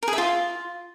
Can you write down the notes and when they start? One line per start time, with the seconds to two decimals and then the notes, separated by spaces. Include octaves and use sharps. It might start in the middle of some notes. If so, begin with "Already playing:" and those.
0.03 A#4
0.08 G#4
0.13 E5
0.18 F4